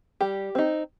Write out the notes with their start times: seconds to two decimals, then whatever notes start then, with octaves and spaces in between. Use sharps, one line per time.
0.21 G3 G4
0.55 C4 D#4